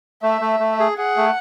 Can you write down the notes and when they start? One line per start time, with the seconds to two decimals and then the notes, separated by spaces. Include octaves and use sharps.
0.23 A3 E5
0.41 A3
0.60 A3
0.80 G#4
0.98 G#4 F#5
1.17 A3